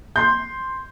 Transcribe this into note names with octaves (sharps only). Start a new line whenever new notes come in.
C6 G6